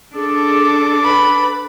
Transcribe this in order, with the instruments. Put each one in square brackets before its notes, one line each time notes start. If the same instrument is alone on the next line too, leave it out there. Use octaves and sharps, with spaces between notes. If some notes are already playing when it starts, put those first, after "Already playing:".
[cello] D4 A4 [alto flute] G#4 [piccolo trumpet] D6
[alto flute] B4 [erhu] B5